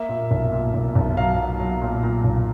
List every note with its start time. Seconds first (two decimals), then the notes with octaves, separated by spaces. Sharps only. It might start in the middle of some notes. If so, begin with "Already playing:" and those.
Already playing: A#3 E5
0.09 A#2
0.31 B1
0.52 A#2
0.74 B1
0.95 B1
1.17 F#3 F5
1.38 F#3
1.60 F#3
1.82 A#2
2.03 A#2
2.24 B1